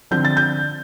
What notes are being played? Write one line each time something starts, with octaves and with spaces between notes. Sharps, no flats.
D3 F3 C4 G6
A6
G6